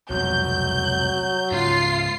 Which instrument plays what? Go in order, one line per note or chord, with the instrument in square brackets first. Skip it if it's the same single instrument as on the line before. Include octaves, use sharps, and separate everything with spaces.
[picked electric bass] C2 F2 B2 [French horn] F#3 [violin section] G6
[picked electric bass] G#2 C#3 [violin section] F4 C7